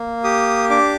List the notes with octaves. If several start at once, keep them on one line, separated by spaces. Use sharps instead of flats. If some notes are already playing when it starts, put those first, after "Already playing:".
Already playing: A#3
G4 D#6
D4 D6